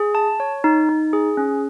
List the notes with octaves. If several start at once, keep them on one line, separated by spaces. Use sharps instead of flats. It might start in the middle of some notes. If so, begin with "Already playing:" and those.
Already playing: G#4
A5
C#5
D#4
D#4
G#4
C#4